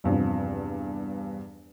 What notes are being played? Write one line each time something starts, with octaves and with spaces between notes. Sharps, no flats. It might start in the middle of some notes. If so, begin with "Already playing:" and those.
E2 G2 C3 F3